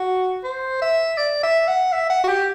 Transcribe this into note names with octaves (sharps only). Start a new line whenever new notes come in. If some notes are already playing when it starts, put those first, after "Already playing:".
Already playing: F#4
C5
E5
D5
E5
F#5
E5
F#5
F#4
G4